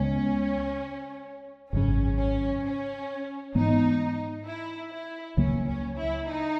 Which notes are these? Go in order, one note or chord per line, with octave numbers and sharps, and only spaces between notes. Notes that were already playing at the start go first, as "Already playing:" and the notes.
Already playing: C#2 C#3 G#3 B3 C#4
G#1 F#2 C#3 C#4
C#4
C#4
G#2 E3 B3 D#4
E4
E4
C#2 C#3 F#3 A#3 C#4
C#4
E4
D#4